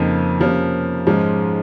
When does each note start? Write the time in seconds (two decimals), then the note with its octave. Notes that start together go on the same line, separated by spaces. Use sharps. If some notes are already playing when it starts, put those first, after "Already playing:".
Already playing: F2 C#3 F3 A#3 D#4
0.39 C3 F3 A#3 C#4
1.07 G#2 F3 G#3 C#4